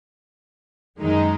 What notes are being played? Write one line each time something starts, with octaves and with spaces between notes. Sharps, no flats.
F#2 D#3 G#3 D#4